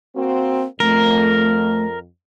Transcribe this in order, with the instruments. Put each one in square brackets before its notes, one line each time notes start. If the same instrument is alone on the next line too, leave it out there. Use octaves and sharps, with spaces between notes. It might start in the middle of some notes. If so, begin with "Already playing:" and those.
[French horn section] A#3 C4 F#4
[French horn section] F2 [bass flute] A3 [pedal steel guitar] A#4